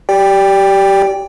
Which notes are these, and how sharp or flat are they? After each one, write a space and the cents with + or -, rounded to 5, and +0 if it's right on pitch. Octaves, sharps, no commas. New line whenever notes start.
G4 -15 D5 -15 G5 +15